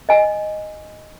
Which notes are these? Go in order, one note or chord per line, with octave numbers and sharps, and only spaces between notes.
D#5 G#5